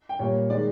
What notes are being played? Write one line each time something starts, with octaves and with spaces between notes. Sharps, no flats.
G5
A#2 G3 A#3 C#5
D#3 G#3 D5